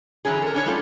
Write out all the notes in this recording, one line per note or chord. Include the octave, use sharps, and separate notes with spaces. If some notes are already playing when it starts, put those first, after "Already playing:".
D3 E3 F#3 C#4 G#4
A4 A#4
C#4 D4 C#5
G3 A3 A#3 F4 A4